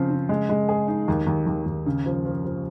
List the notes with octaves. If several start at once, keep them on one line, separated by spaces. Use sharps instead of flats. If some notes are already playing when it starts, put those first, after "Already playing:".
Already playing: C#3 F3 C4
C#3
G#3
G#3
G#4
D#4
D#2
D#2
D#2
D#2
C#3
F3
F3
F3